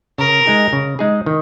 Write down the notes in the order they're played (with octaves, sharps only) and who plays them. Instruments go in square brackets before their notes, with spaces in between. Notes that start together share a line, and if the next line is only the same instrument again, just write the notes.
[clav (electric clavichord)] C#3 [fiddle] A#4
[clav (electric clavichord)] G#3 D#4 G#4
C#3
G#3 D#4 G#4
D#3